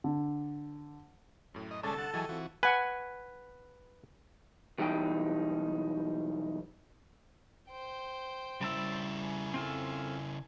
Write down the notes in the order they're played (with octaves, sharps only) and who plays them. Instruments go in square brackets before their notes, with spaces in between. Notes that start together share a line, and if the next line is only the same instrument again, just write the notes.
[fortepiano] D3
[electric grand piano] F#2 A2
[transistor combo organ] D#5
[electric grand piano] C2 D3 A6 [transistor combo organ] G#3 C#4 D4 [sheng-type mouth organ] A4 [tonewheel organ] A5
[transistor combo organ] F#5
[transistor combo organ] E3 F#3 G#4 [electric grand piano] D#5 G5 D#7
[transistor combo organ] E3 F#4 [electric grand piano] C4 F4
[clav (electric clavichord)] B4 [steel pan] F#5 G#5
[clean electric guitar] B1 E3 G3 D#4 G5
[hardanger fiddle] C5 G5
[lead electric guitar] C#3 E4 [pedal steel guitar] G3 A5 E6
[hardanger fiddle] G#5
[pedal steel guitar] C4 F4 A4